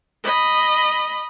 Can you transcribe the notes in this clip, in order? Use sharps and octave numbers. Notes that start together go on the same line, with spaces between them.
D#5 B5